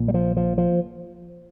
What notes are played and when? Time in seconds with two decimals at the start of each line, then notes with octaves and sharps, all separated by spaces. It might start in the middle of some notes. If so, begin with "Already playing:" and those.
Already playing: A#1 A#2
0.08 G3
0.14 F3
0.37 F3
0.58 F3